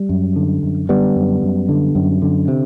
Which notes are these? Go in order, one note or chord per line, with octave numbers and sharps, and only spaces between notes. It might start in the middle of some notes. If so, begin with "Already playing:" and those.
Already playing: G3
F#2
D3
F#2
D3 G3 B3
F#2
F#2
D3
F#2
D3
C3